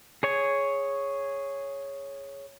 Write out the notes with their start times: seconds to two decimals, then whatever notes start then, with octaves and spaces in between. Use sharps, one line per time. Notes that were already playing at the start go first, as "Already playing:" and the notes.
0.23 G#4 C#5 G#5